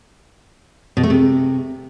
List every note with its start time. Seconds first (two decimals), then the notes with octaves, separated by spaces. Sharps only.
0.97 B2
1.03 A3
1.10 C3